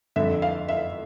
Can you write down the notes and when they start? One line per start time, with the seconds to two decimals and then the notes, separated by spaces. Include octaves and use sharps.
0.16 F2 D3 E5
0.42 F5
0.68 E5